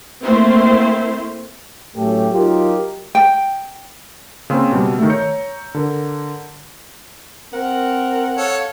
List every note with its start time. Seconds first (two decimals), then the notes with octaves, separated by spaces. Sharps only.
0.24 A3 A#3 C4 E4 C5
1.96 A2 F#3 A3 C#4 G4 A4
2.32 F#3 D#4 F4 G4 A#4
3.15 G5
4.50 C#3 A#3 C4 C#5 C6 E6
4.72 B2 G3
4.98 D#3 A3
5.10 C#5 A#5 G6 C#7
5.74 D3 A#4
7.53 C4 A#4 F#5
8.37 A4 C#5 F5